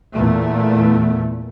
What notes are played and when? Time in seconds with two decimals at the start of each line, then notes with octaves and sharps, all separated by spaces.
0.13 E2 A#2 A3